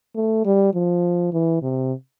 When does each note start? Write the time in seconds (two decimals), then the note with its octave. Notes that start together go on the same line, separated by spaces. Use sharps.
0.15 A3
0.46 G3
0.74 F3
1.33 E3
1.62 C3